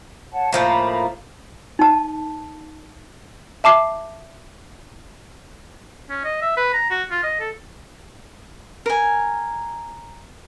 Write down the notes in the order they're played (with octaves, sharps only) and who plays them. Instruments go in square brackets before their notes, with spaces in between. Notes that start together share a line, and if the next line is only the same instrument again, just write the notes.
[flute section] C#5 F#5 A5
[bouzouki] A2 F3 A#3 [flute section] A#5 B5
[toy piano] D#4 A5
[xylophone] E5 A5 D6 C7
[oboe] C#4
D#5
E5
B4
A#5
F#4
F4
D#5
A4
[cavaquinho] A#4 G#5